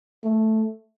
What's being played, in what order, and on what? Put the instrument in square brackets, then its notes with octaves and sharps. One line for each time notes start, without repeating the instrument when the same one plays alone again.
[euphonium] A3